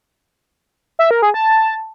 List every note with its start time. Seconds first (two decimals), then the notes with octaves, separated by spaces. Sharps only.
0.99 E5
1.11 A#4
1.22 G#4
1.34 A5